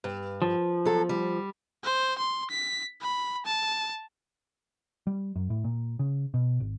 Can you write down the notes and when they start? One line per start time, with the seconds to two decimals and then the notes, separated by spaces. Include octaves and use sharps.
0.04 G2
0.42 F3
0.85 F#3 A4
1.09 G3
1.84 C5
2.18 C6
2.50 B6
3.01 B5
3.46 A5
5.07 G3
5.36 F#2
5.50 A2
5.64 A#2
5.99 C#3
6.34 B2
6.60 G#1